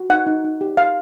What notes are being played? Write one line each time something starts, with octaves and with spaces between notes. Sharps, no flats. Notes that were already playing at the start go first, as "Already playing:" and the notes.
Already playing: F#4
D#4 F#5
D#4
D#4
G4
G4 F5